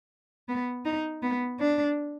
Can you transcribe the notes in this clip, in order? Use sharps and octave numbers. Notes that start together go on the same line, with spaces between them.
B3
D#4
B3
D4